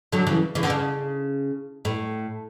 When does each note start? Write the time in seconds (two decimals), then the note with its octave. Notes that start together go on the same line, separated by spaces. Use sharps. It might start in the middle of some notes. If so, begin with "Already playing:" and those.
0.12 D3 F#3
0.27 C#3 E3
0.55 C#3 E3
0.63 D3
0.70 C#3
1.85 A2